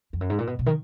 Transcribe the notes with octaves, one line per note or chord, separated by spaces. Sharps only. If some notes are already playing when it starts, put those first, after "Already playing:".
F2
F#2
G#2
A#2
B2
B2
D#3